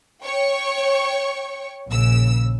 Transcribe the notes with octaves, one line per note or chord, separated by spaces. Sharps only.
C#5 G5 C#6
A#1 C#3 E6